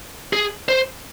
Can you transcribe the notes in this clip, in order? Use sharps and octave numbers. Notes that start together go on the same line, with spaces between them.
G#4
C5